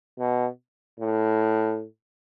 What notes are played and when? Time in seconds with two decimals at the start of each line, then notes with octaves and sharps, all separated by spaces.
0.19 B2
1.00 A2